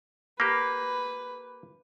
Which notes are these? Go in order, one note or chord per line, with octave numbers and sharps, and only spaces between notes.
A#3 G4 B4